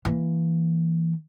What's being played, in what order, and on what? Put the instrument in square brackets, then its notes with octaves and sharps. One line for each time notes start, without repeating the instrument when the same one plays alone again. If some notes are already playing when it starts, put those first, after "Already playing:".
[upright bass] E3 A#3